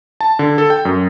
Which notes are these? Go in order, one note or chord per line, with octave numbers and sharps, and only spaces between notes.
A5
D3
A4
G5
F#2